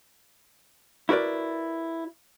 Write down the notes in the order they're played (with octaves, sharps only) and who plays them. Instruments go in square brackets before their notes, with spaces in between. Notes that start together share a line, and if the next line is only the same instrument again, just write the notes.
[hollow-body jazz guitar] E4 F#4 A#4 B4 D5